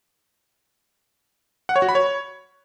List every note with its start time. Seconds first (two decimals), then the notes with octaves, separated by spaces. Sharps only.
1.69 F#5
1.76 C#5
1.82 F#4
1.89 B5
1.95 C#5